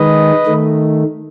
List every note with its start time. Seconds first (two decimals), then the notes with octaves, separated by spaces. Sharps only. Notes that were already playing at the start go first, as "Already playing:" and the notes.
Already playing: D#3 G#3 B4 D#5
0.46 D#3 A3